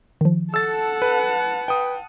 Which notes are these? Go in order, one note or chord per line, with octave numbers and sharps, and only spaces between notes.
D#3 F3
A4 F#5 A5 E6 A6
B4
B4 G5 D#6